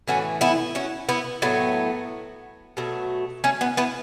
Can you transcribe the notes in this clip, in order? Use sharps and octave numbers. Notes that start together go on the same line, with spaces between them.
A2 E3 A3 C#4 F#4
B3 E4
C#4 F#4
B3 E4
A2 F#3 A3 B3
B2 F#3 A3
A3 C#4
B3 E4
B3 E4